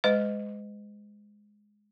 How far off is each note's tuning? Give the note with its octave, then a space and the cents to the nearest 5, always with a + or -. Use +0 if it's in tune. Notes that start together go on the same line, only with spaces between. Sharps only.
G#3 +0 B4 +45 D#5 +0